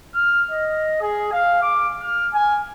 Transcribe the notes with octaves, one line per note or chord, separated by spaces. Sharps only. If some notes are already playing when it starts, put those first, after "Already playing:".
F6
D#5
G#4
F5
D6
F6
G#5